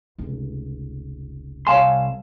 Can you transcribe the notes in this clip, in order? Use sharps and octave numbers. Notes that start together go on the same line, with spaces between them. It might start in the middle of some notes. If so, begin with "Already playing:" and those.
F1 C#2
C2 C#5 F5 G#5 A5 C6